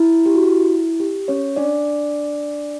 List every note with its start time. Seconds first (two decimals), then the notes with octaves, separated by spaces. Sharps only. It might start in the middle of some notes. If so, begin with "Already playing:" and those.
Already playing: E4
0.26 G4
0.35 F#4
0.44 E4
1.00 G4
1.28 C#4 C#5
1.56 D4 D5